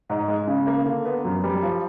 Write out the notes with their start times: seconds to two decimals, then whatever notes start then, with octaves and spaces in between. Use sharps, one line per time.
0.09 G#2
0.28 G#3
0.48 C#3
0.67 A#3
0.86 D3
1.05 B3
1.25 F#2
1.44 G3
1.62 F3